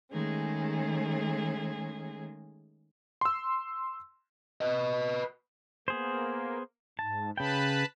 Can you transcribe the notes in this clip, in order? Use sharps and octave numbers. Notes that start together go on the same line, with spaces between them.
D#3 G#3 A3 C#4 G#4
C6 E6
B4 D#5
A#3 B3 G#4 C5
G#2 A5
C#3 B4 G5 A5 B5